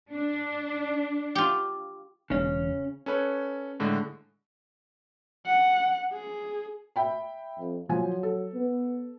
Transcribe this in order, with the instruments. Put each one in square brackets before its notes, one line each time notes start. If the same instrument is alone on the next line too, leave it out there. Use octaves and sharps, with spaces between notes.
[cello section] D4
[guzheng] F4 G4
[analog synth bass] E1 [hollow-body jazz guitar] C#3 C#4
[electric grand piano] C#4 A4 B4 C#5
A2 D3 G#3
[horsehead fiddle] F#5
G#4
[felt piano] E5 G5 B5
[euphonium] F2
[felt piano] F3 G#5 [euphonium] F#3
[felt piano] A4
[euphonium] B3